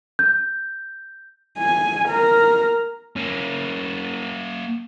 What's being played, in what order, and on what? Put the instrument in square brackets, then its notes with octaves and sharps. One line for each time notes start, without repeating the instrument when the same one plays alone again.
[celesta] G6
[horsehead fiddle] G#5
A#4
[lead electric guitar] A#3 C#4